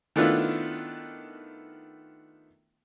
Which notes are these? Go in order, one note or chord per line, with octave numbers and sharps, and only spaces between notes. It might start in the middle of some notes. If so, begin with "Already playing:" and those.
D#3 A3 B3 D4 E4 F4